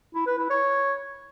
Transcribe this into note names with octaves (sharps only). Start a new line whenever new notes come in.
E4
B4
E4
C#5